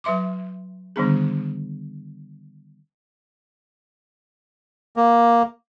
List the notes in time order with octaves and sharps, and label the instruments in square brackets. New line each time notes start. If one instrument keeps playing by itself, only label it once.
[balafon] F#3 B4 E5 C6 D6
D3 D#3 G3 B3 D4 G#4
[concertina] A#3